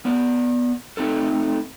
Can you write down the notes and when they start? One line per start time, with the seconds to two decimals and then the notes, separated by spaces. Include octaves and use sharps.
0.05 B3 D5
0.97 A3 C4 D#4 A4